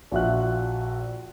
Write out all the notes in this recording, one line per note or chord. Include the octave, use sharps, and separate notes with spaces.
A#1 F4 F#4 E5 F#6